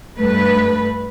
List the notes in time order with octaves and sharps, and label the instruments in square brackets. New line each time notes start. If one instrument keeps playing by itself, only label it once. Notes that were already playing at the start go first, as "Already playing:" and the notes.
[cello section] G2 A3 B4